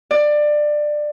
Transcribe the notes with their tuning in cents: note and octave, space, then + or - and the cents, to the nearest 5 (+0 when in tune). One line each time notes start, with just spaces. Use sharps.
D5 +20